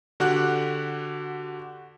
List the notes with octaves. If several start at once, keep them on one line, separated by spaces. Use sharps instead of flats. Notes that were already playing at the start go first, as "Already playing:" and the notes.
D3 F#4 G4 F#5 F#6